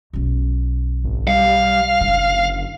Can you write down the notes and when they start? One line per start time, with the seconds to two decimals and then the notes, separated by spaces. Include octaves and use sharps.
0.13 B1 C#4
1.04 G#1
1.28 G3 F5
2.01 F#1 D3